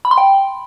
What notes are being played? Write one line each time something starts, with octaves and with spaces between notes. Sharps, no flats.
B5
C6
G5